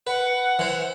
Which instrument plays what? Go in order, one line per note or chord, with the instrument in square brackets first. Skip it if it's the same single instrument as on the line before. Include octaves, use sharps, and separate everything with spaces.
[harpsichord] B4 [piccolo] F#5
[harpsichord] E3 C5